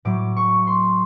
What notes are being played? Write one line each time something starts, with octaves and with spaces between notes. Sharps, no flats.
A2 F#3 D6
C#6
C6